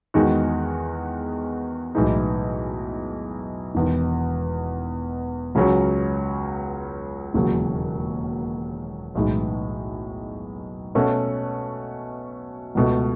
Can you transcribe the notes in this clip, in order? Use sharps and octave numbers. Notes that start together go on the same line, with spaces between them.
E2 D#3 G#3 D#4 F#4
B1 A2 E3 G#3 D#4
E1 E2 D#3
C#2 C#3 F#3 C#4
E1 D#2 C#3 F#3
B1 A2 E3 G#3 D#4
B2 A3 C#4 F#4 A4
C#2 B2 A3